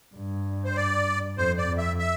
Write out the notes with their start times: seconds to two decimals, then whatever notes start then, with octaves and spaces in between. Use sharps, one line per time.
0.15 G2
0.65 C5
0.76 D5
1.38 F2 C5
1.58 D5
1.68 F2
1.78 E5
1.99 E5